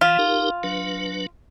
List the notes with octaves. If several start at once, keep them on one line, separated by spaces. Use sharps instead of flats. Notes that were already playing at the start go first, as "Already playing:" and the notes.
E3 F4
D#4 G4 A#4
F#3 D4 B4